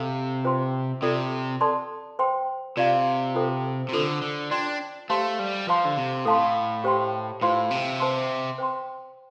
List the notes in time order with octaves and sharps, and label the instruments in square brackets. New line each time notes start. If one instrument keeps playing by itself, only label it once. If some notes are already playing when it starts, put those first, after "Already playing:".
Already playing: [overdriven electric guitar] C3 [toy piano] A4 F5
[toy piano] F4 C5 G5 C6
[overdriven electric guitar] C3 [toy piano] F4 A4 D5
[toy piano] A4 D5 A5 C6
C5 G5 C6
[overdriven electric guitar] C3 [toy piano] F4 D5 F5
[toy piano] F4 A4 C5 G5
[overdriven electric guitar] C3
[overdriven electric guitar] D3 [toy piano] F4 A4 C5
[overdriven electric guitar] D3
[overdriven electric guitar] D4 [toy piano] F4 D5 G5 C6
[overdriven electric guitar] A3 [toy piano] G4 C5 F5 A5 C6
[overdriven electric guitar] G3
[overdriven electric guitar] F3 [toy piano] C5 F5 A5 C6
[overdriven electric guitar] D3
C3
[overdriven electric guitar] A2 [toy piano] A4 F5 A5 C6
[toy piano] G4 C5 G5 C6
[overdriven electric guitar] A2 [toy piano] F4 C5 F5 C6
[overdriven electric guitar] C3
[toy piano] C5 A5 C6
C5 G5 C6